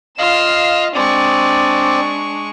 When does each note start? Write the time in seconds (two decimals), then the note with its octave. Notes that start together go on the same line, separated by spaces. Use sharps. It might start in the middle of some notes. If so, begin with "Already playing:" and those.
0.19 F4 D#5 F5 C7 E7
0.95 G#3 C4 D4 D5 C#6